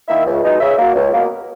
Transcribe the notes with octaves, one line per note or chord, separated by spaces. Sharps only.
D#3 A#3 E4 E5
C#2
B2 G#3 D#4
C#3 E5
F#3 A#3
C#2
B2 F#3 A#3